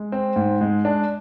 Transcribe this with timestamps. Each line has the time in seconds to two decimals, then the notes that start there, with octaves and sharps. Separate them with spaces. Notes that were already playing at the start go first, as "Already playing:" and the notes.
Already playing: G#3
0.12 C4
0.36 G#2
0.61 G#3
0.85 D4